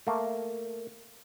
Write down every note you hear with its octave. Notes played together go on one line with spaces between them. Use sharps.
A3 A#3